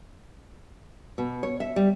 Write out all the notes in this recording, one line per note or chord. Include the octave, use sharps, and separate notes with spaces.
B2
C#5
E5
G3